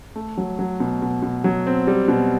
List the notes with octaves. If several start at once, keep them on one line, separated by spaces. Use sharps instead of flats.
A3
F#3
F#3
B2
B2
B2
F#3
C4
G3
B2